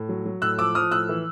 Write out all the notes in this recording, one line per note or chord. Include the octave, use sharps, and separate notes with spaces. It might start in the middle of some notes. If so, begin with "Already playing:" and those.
Already playing: A2
F#3
F#3
A2 E6 F#6
F3 D6 E6
F3 D#6 F6
A2 E6 F#6
E3